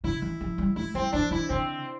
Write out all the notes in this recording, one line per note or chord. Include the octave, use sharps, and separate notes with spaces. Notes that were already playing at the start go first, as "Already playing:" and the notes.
D3 E4
E3
F3
G3
A3 E4
G3 C4
F3 D4
E3 E4
D3 C4